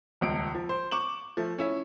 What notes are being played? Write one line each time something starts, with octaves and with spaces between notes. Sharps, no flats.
D#1 C#2 D7
F3
C5
C#6 D6 E7 F#7
F3 A3
C#4 E4 E5